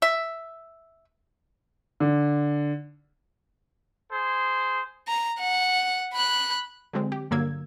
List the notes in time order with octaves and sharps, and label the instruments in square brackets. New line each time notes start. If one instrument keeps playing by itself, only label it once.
[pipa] E5
[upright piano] D3
[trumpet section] G#4 C5
[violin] A#5
F#5
B5 F#6
[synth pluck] D3 F#3 G#3 C4
G4
G2 D3 F#3 A#3 E6 G#6